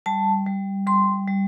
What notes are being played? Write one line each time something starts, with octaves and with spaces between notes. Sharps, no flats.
G3 A5
G3
G3 C6
G3